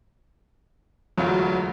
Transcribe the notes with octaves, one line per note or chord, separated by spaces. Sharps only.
E1 D2 F#3 F4